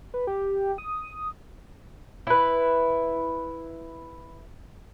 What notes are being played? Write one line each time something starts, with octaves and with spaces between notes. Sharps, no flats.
B4
G4
D#6
E4 B4